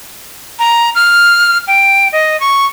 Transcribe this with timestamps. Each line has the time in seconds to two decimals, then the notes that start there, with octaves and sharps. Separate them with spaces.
0.59 A#5
0.95 F6
1.68 G5
2.12 D#5
2.40 C#6